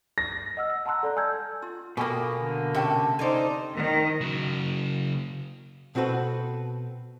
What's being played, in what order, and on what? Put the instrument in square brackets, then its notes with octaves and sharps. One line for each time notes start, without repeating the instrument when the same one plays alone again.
[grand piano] A#6
[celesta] D#5 F#5 E6 F6
E6
F#5 A5 A#5 C6 E6 F#6
A4 D5 A5 A#5
G#5 E6 F6 G6 G#6
[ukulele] F4
[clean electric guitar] B2 A#3 [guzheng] G4 D#5 [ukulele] A4 G#5 B5
[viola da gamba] D3
[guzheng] C3 C#4 [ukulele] E5 G5 A5
[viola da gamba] D#4 C5 [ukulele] A4 [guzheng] D5 F5 G#5
[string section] D#3
[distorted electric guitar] C#3 F#3
[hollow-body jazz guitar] B2 C4 F#4 A4 B4